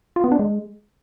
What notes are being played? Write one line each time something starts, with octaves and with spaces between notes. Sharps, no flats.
F4
B3
D4
G#3